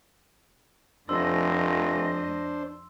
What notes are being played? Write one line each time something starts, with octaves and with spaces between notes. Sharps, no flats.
F1 F2 A3 D4 C5 D#5 C6 E6